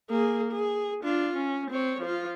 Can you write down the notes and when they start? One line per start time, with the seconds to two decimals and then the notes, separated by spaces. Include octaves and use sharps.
0.10 A#3 G#4
0.52 G#4
1.04 D4 F4
1.37 C#4
1.71 C4 C#5
2.02 F3 F4